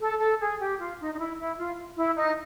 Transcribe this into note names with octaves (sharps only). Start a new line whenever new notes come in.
A4
A4
G#4
G4
F4
D#4
D#4
E4
E4
F4
E4
D#4